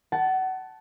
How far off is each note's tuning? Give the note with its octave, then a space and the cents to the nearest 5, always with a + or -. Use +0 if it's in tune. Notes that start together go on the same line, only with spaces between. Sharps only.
F#5 +30 A5 -10